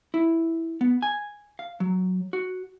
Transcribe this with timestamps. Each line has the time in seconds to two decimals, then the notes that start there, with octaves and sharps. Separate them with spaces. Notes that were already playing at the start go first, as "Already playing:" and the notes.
0.14 E4
0.81 B3
1.02 G#5
1.59 F5
1.80 F#3
2.33 F#4